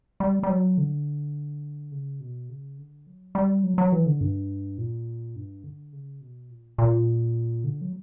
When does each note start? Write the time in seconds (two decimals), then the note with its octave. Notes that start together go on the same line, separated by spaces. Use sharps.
0.20 G3
0.43 G3
0.49 F#3
0.78 D3
1.92 C#3
2.21 B2
2.49 C#3
2.78 D3
3.07 F#3
3.35 G3
3.63 F#3
3.78 F#3
3.92 E3
4.06 D3
4.21 G2
4.78 A#2
5.36 G2
5.64 D3
5.93 C#3
6.21 B2
6.50 A#2
6.78 A#2
7.64 D3
7.81 F#3